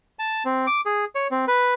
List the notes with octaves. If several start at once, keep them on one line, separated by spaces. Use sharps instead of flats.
A5
C4
D6
G#4
C#5
C4
B4